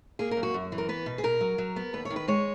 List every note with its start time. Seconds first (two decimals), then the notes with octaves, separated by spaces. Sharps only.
0.19 A#3 G#4
0.31 A#4
0.37 F#2
0.43 F#4
0.54 F#2
0.72 E3
0.78 A#4
0.89 B3 B4
1.06 B2
1.18 G#4
1.23 B2 A#4
1.41 F#3
1.58 F#3
1.76 B3
1.93 D#2 B4
2.05 C#5
2.10 D#3
2.16 B4
2.28 G#3 C#5